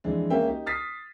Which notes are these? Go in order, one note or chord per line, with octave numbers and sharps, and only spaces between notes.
F2 E3 G#3 D4
G#3 A#3 C#4 E5 G5
D#4 G4
D#6 F6 A6 B6 C7